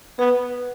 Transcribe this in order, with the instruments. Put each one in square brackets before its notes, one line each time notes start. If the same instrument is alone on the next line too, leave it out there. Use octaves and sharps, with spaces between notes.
[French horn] B3 [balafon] B4